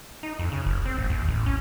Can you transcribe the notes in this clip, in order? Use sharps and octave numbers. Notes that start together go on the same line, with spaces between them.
D#4
F2
C#3
F#1
C4
G#1
D#2
A1
C#4